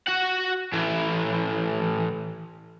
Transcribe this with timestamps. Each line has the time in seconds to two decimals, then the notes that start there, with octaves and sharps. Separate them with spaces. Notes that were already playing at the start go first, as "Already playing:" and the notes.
0.07 F#4 F#5
0.73 A2 E3